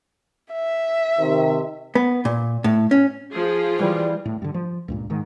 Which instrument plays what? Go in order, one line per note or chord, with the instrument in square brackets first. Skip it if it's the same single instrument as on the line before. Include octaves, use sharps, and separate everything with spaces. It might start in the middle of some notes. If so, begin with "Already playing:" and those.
[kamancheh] E5
[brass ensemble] C3 D#3
[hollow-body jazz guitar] B3
A#2
A2
C#4
[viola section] F3 F4 G#4
[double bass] E3 G3
[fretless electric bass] A2
G2 D3
F3
C#2 G2 A#2
G#2 D#3